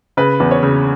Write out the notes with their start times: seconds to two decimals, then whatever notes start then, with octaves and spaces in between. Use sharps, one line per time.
0.17 C#3 B4
0.40 E2
0.51 C#5
0.63 C#3